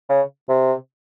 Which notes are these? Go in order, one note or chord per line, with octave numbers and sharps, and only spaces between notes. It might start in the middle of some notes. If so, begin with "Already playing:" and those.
C#3
C3